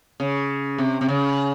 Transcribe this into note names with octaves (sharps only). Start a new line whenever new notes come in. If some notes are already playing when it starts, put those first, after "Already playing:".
C#3
C3
C3
C#3